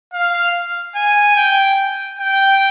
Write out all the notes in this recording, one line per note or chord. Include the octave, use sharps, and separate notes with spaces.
F5
G#5
G5
G5